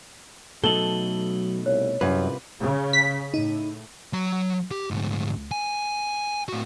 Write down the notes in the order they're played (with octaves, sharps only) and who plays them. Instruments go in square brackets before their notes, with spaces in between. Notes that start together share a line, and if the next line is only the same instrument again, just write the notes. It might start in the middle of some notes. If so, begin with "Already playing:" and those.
[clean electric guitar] B2 A3 D#4 [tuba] F#3 [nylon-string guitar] A4 [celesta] F#7 G7
[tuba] C2 [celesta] C#5
[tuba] C2 [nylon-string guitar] F#2 [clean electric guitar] C3 F4 B4
[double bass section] C#3
[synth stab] B6
[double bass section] A2 [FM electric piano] D#4
[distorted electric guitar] F#3 A#5
G4
D2 G#2
G#5
A2 F#4